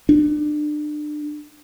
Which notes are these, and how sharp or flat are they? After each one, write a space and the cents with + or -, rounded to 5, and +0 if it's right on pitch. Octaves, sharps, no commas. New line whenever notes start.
D4 +30